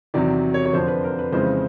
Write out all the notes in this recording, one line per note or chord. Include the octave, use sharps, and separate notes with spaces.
E2 C3 D#3 F#3 D5
C#5
C#5
F2 D3 F3 C5
B4
A#4
B4
F2 C#3 E3 G#3 C5